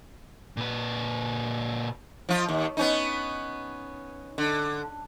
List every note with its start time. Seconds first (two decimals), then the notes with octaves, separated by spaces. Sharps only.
0.57 A#2 B4
2.29 F3 F4
2.49 D#2
2.77 B3 C#4 D#4
4.38 D3